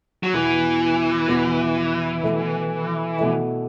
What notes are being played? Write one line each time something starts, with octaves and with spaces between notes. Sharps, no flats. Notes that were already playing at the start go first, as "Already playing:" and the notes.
F#3
E2 B2 E3 B3 F#4
E2 B2 B3 F#4
B2 A3 E4
B2 A3 E4